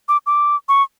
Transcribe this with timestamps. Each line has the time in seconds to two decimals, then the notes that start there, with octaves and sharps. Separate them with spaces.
0.08 D6
0.26 D6
0.69 C#6